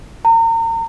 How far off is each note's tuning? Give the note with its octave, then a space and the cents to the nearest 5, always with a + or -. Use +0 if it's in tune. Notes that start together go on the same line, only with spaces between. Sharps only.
A#5 -35